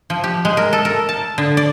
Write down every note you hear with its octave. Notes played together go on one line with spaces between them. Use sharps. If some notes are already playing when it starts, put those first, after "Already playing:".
F3
G4
G#3
A#4
A4
A#4
A5
D3
D5